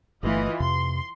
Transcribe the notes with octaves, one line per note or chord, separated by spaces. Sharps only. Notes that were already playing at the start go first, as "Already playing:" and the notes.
G1 E3 A3 F4 D#5
F2 C3 C6